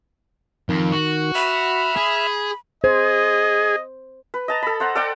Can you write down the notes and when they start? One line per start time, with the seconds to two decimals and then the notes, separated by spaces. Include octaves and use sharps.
0.69 F2 D#3
0.92 F#4
1.35 E5 B5 E6 F6
1.96 G#4
2.84 G#4 C5 D#5
4.34 B4
4.48 D#5 A5 A#5
4.62 A4 B5
4.80 C5 F#5 A#5
4.95 A4 D5 F#5 G5